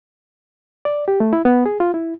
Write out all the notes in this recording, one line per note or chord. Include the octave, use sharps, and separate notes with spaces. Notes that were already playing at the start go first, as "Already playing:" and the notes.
D5
G4
A3
E4
B3
G#4
F4
E4